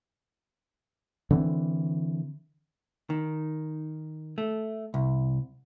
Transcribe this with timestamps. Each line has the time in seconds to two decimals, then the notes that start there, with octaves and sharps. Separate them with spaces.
1.31 D3 E3 C4
3.10 D#3
4.38 A3
4.94 C2